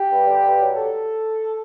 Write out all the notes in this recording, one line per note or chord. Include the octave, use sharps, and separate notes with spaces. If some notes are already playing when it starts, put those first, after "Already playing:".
Already playing: G4
G2
D3
G2
F#3
A4